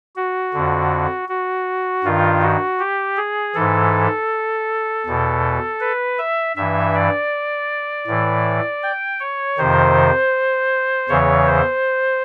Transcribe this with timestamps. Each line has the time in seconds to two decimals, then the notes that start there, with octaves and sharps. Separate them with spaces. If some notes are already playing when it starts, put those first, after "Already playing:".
0.16 F#4
0.53 F2 D3
1.29 F#4
2.04 G2 D#3 F4
2.42 F#4
2.80 G4
3.17 G#4
3.55 G#2 E3 A4
5.06 E2 B2
5.81 B4
6.18 E5
6.56 G2 E3 E5
6.94 D5
8.07 A2 E3
8.83 G5
9.20 C#5
9.58 F2 C3 D#3 C5
11.09 E2 C#3 E3 C#5
11.47 C5